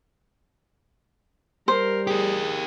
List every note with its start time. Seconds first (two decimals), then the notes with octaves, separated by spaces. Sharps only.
1.68 G3 A#4 C5
2.07 G4 G#4 A#4